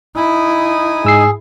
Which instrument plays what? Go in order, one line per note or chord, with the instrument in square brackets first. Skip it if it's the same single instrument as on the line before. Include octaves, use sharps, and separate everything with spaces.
[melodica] D#4 G#5 D#6 [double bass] E4
[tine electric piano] G#2 E6 C7 [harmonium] G#4